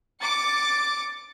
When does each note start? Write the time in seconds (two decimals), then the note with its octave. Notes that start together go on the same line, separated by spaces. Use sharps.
0.20 D6 A6 C#7